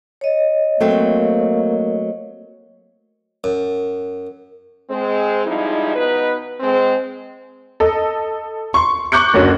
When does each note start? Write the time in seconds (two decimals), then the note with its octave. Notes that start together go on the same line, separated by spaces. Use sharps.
0.21 C#5 D#5
0.81 F#3 A3 A#3 C4
3.44 F#2
4.90 G#3 C4
5.45 F3 G3 G#3 D#4 E4
5.96 B2 D#4 B4
6.60 G#3 C4
7.80 A4 D#5
8.74 C6 C#6
9.12 C#6 D6 F#6 G6 C#7
9.33 F#1 D2 C#4 F#4